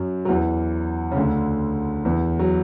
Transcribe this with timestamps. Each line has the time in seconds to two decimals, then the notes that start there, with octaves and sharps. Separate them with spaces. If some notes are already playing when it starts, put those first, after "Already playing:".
Already playing: F#2 F#3
0.25 F#3
0.29 E2 E3
1.11 C#3
1.16 D2 D3
2.05 E2 E3
2.39 F#3